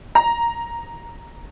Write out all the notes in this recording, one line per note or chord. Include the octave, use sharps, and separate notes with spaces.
A#5